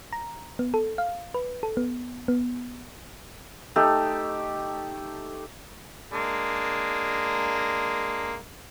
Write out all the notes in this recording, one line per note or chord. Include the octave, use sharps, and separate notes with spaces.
A#5
B3
A4
F5
B4
A4
B3
B3
A3 D#4 G4
G#3 A#3 D4